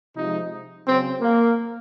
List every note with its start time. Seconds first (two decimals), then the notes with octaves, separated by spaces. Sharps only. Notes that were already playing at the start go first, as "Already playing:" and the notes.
0.16 C3 F3 G#3 D#4
0.86 C#3 F#3 C4
1.21 A#3